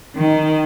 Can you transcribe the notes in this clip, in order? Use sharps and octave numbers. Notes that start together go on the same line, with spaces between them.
D#3